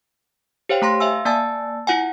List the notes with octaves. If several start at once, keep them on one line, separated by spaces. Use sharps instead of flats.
G4 C5 C#5 F5 G5
A3 A#5 C6 A#6
E5 F5 G#5 E6
A#3 D5 G#5 A5 E6 A6
E4 F4 F#5 G#5